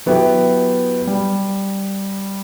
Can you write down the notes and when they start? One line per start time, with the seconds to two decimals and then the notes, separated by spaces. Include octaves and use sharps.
0.06 F#3 B3 E4 G4
1.07 G3